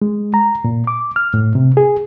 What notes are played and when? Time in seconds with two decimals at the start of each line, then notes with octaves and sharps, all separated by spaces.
0.02 G#3
0.34 A#5
0.64 A#2
0.87 D6
1.16 F6
1.34 A2
1.55 C3
1.77 G#4